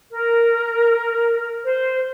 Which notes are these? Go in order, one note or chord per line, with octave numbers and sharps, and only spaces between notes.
A#4
C5